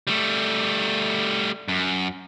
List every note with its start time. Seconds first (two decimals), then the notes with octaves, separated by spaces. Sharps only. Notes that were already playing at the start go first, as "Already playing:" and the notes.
0.07 G3 A3
1.68 F#2